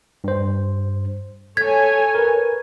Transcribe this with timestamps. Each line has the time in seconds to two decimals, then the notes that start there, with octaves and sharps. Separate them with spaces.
0.24 G2 C5
1.57 A4 C#5 G#5 G#6 B6
2.15 A#4 B4